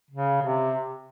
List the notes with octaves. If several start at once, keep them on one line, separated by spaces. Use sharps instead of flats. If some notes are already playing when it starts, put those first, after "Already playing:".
C#3
C3